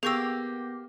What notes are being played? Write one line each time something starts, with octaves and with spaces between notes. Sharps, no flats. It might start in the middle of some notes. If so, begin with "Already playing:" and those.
A#3 B3 G4 G#4 C#6 E6 G6 A#6